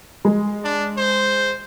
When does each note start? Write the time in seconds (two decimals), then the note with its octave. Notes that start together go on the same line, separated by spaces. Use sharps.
0.25 G#3
0.64 D4
0.97 C5